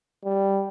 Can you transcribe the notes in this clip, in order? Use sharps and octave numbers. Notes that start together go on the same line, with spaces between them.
G3